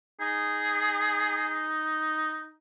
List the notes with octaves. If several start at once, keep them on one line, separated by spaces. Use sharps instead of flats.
D#4 G#4